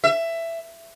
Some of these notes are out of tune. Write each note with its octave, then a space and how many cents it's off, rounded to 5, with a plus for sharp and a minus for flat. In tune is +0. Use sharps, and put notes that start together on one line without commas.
E5 +15